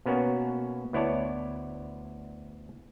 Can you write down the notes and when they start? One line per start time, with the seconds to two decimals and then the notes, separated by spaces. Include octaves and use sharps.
0.06 B2 A#3 B3 C#4 F#4
0.93 D2 B3 E4 C#5 D5 A5